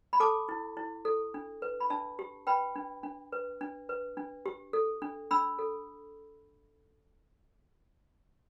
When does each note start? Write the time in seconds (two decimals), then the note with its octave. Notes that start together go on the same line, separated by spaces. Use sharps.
0.13 B5
0.20 A4 A5 D6
0.49 E4
0.77 E4
1.05 A4
1.34 D4
1.62 B4
1.80 B5
1.90 D4 E5 A5
2.19 G4
2.47 B4 G5 B5
2.76 D4
3.03 D4
3.32 B4
3.61 D4
3.89 B4
4.17 D4
4.46 G4
4.73 A4
5.02 D4
5.31 D4 B5 E6
5.59 A4